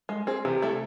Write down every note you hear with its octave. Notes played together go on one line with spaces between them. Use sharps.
G#3
C4 G#4
C3 E3
A3 E4 A4